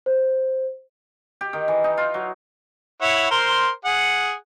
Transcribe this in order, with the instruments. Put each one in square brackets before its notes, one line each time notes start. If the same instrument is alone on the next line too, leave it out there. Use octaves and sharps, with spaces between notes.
[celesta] C5
[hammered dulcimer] G4
D#3
E3
D#4
F4
F#3
[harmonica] E4 C#5 F#5
A#4 C5 C6
G#4 F#5